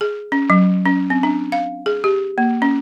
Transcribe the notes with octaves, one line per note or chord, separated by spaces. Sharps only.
G#4
C#4
F#3
C#4
C4
D4
F5
G#4
G4
A#3
C#4